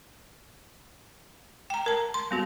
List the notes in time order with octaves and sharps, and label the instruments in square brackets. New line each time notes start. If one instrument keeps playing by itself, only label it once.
[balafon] G5 A#5
A#4 A5
C6
G3 B3 F#4